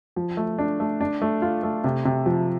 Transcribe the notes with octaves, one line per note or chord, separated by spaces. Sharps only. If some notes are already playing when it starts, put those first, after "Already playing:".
F3
A3
D4
A3
D4
A3
F4
A3
C3
C3
F3